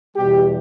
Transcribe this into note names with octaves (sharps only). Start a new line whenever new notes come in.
E2 B2 G3 G4